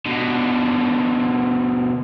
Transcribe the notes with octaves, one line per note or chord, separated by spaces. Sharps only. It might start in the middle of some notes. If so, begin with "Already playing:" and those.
B2 D3